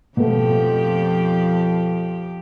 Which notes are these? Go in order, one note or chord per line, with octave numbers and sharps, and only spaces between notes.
F2 B2 F3 A3 G4